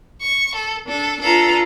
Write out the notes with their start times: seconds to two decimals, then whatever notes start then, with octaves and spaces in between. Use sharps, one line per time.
0.22 C#6
0.56 A4
0.86 D4 A4
1.20 D4 F4 A4 B4 A#5